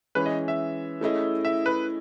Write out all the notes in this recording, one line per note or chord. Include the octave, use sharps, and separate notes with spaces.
E3 G#3 C#4 B4
D#5
E5
A3 C#4 E4 G#4 D#5
E5
B4